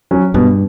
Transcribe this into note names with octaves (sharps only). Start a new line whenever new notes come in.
F#3 C#4
G2 B2